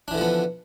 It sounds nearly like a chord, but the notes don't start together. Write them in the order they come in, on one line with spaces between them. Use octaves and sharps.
D4 E3 D3 F3 B3